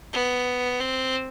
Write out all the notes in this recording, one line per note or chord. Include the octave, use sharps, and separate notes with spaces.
B3
C4